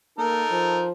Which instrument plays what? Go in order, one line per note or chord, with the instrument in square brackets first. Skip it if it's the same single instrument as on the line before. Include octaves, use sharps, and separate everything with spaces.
[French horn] A#3 [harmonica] D#4 A4 A#4
[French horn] F3